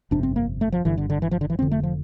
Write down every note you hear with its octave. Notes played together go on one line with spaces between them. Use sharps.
G1 F2 C3 D4
C4
A#3
A3
F3
G1 G2 D3 E3
D3
D3
E3
F3
D3
E3
F1 F2 D3 C4
A3
F3